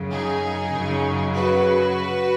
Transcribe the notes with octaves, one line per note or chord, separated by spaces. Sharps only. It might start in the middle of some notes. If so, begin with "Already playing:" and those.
Already playing: F#2 C#3 F#3
D#4 G#4
F#2 C#3 F#3
F#4 B4